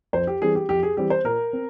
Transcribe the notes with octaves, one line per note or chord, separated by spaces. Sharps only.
F2 C5
G4
E3 G3 C4 G#4
G4
F2 G4
G#4
E3 G3 C4 G4
C5
A#2 A#4
C4